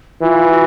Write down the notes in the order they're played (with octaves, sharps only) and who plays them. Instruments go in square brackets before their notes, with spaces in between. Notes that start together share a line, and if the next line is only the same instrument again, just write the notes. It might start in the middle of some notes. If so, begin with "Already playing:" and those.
[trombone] E3 [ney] F4
[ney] F#4